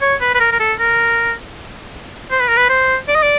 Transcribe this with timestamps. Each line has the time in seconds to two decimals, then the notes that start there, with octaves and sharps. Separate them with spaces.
0.02 C#5
0.21 B4
0.35 B4
0.40 A#4
0.52 A#4
0.60 A4
0.79 A#4
2.31 C5
2.40 B4
2.48 A#4
2.57 B4
2.70 C5
3.08 D5
3.15 D#5
3.23 D5